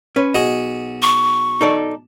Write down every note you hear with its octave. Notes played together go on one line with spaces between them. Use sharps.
C#4 B4
B1 F#4 G#4 D#5
C#6
D#4 A4 D5